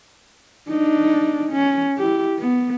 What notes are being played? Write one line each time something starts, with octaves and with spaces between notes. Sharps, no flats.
D4 D#4
C#4
E4 G4
B3